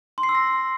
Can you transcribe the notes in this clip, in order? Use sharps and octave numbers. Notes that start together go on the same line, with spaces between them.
C6
C7
E6
A#6